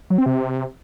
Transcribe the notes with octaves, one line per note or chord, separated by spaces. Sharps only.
F#3
C4
C3